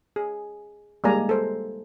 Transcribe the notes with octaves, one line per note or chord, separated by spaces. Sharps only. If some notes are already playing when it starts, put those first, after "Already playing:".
G#4
G3 G#3 A#3 D5 G#5 A#5
A4 C5